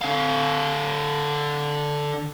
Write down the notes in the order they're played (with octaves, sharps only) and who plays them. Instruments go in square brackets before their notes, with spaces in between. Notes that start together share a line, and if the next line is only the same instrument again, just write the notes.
[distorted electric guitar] D3 F5